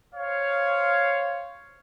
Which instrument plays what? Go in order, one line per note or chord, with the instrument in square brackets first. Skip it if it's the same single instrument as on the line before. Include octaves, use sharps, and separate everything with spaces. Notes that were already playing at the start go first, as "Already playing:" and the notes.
[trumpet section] C5 C#5 F5